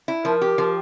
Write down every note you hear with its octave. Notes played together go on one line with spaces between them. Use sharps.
E4
F3 A#4
G4
F3